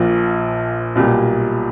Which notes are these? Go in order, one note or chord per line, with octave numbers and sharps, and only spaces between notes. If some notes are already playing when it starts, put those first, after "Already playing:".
Already playing: A#1 A#2 F3
B1 A#2 G3